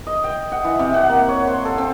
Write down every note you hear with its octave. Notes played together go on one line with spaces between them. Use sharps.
D#5
G5
F#5
E3
C3
F#5
A#3
C#5
C5
A4
C4